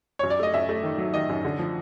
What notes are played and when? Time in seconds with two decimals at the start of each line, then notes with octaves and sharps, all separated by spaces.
0.19 F#2 C#5
0.30 D5
0.39 A3 D#5
0.54 F#2 E5
0.69 A3
0.83 D#3
0.98 F#3
1.14 D#3 D#5
1.29 F#2
1.45 D3
1.59 F3